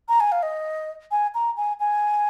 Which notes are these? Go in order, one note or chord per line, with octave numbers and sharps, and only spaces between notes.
A#5
G#5
F5
D#5
G#5
A#5
G#5
G#5